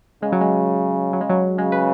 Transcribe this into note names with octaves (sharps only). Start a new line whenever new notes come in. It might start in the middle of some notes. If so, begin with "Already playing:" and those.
C#3 G#3
F#3
G#3
F#3
G#3
F#3
C#3 G#3
B4